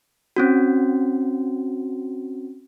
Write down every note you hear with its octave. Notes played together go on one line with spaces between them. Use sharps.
C4 C#4 F#4